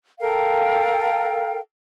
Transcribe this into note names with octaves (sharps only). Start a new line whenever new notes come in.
A4 A#4 F5 G5